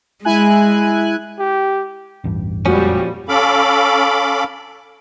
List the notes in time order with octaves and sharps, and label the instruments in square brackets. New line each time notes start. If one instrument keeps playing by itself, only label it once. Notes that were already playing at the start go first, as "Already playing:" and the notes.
[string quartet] G#3 [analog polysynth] E4 G#5 F#6
[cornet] G4
[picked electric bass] A1 E2 G2
[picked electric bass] F#1 F2 G#3 [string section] A#2 G3 [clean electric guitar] F3 C#4 [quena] F#4
[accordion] C#4 A4 F5 B5 D6